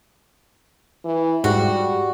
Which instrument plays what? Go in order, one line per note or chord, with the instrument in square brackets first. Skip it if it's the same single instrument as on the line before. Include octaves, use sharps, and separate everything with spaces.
[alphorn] E3
[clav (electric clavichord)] G#2 [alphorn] G3 [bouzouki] F#4